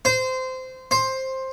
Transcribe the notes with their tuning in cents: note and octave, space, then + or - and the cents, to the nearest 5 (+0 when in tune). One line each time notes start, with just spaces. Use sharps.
C5 -20
C5 +10